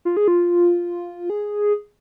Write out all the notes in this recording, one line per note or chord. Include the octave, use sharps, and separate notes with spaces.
F4
G#4
F4
G#4